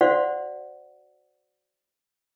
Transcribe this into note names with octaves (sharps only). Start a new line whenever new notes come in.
F#4 C5 D5 F5 F#5